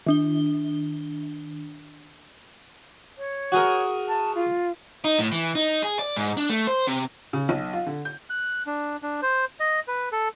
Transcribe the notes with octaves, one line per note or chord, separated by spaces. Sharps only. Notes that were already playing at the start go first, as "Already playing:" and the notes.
D#3 D4 G7
C#5
F#4 G#4 A#4
A5
F4
D#4
A2
E3
D#4
G#4
D5
G#2
D4
A3
C5
C3
C#3
B1
F4
D3
G6
F#6
D4
D4
C5
D#5
B4
A4